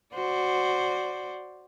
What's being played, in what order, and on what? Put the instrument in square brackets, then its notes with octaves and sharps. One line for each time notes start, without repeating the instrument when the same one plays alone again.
[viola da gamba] F#4 C5 D5